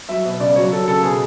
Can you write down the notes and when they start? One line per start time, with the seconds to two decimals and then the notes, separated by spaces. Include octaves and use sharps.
0.09 F#3 E5
0.25 B2
0.40 C#3 D5
0.56 F#3 C#5
0.72 F#3 A4
0.87 C#3 A4
1.03 B2 G#4